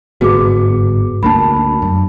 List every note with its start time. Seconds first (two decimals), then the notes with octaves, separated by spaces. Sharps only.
0.21 G1 G#2 B3 F#4 G#4 D6
1.23 D2 A#3 D4 A5 B5
1.82 F#2